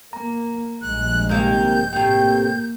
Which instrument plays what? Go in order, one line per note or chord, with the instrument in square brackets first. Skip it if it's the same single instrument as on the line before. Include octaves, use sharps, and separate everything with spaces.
[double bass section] A#3 [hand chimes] A#5
[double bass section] A#1 G2 G#3 [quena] F#6
[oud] C3 D#3 A#3 [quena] G6
[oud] A2 C3 [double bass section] A#3 [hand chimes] G4 G5